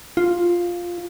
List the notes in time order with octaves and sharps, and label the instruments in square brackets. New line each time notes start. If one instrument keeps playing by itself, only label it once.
[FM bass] F4